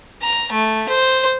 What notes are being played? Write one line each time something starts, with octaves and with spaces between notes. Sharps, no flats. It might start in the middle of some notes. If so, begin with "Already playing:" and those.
A#5
A3
C5